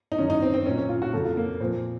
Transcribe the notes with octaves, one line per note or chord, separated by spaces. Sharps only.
D#4
F#2 D#3 F#3 C#4
D#4
C4
C4
A#2 F#3 C#4
C#4
F4
F#4
F2 C#3 F#3 A4
F4
A#3
A#2 F3 C4